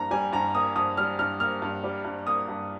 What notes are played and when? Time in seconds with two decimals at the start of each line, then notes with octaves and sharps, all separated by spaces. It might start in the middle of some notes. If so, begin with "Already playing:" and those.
Already playing: G2 A#3 A#5
0.11 G3 G#5
0.33 G2 A#5
0.54 A#3 D#6
0.76 G2 D#6
0.97 G3 F6
1.19 G2 F6
1.40 A#3 F6
1.62 G2
1.84 G3
2.05 G2
2.27 A#3 D#6
2.48 G2